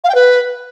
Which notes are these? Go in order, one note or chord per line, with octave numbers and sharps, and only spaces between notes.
F5
G5
B4